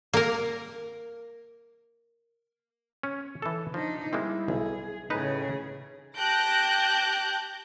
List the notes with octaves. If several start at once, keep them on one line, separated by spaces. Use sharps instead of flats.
A#3 A#4
C#4
E3 A4
F3 D4 D#4
G3 G#3 A#3 C4 E4
B1 G#4
A2 C#3 D#4 G#4 B4
G4 A5 F#6 G6 A#6 D7